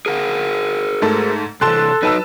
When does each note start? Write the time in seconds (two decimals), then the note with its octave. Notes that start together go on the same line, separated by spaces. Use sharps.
0.06 G#4 A#4 F#5
1.02 G#2 A3 A4
1.61 C3 E3 A4 A5 C6 F#6
2.03 F#3 D#4 B4 A5 E6